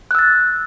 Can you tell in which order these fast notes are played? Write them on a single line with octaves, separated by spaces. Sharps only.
F#6 E6 A6